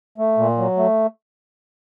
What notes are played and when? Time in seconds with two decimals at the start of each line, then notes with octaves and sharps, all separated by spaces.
0.18 A3
0.38 A#2
0.57 F#3
0.77 A3